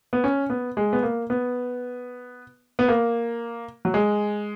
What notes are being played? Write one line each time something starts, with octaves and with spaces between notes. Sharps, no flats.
B3
C#4
B3
G#3
B3
A#3
B3
B3
A#3
F#3
G#3